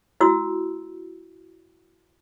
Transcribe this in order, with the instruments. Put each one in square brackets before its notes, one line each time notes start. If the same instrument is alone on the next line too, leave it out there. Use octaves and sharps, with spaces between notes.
[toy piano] E4 F#4 E6